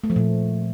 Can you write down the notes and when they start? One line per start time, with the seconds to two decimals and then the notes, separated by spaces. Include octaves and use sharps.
0.04 A3
0.10 F3
0.16 A#2